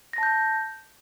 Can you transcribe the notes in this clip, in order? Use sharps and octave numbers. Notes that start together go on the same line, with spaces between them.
A5 G6 A#6